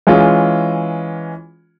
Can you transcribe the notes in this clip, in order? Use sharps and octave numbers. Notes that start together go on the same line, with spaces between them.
E3 G#3 C#4 F4